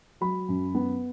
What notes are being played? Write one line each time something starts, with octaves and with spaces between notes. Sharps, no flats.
F#3 B5
F#2
B3